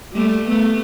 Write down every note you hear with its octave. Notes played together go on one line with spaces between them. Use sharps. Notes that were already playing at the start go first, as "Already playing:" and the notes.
G3 A3
A3 B3